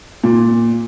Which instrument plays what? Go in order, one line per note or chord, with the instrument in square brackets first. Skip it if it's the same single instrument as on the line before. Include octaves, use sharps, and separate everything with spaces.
[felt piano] A#2